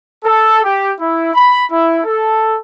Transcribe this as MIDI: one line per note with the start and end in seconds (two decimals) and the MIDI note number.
0.24 0.61 69
0.64 0.90 67
0.99 1.33 64
1.34 1.63 83
1.71 1.98 64
2.04 2.57 69